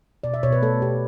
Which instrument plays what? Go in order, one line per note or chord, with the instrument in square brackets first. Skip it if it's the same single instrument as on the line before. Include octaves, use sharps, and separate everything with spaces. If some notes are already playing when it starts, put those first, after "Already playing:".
[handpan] B2 D5
E5
B2 C#5
B4
A3 A4
B2 G4